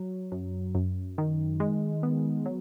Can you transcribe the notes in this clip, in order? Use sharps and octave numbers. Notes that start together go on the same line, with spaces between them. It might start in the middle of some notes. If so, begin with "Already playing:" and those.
Already playing: F#3
F#2
F#2
D#3
G#3
B3
F#3